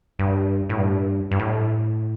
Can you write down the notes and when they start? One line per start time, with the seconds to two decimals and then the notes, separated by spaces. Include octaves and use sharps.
0.19 G2
0.69 A2
0.78 G2
1.31 G2
1.39 A2